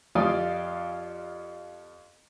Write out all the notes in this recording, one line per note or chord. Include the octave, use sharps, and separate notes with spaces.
F2 F3 F4 G4 D5 D#6